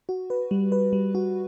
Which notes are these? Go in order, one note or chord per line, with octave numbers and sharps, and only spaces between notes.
F#4
B4
G3
B4
G3
F#4